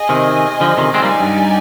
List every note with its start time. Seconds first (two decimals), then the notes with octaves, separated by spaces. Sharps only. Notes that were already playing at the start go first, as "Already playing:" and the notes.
Already playing: G#4 D#5 G#5
0.09 C3 D#3
0.60 D3 F3
0.77 C3 D#3
0.94 G#3 C4 D#4 G4 D5 G#5
1.02 G3 A#3
1.20 G2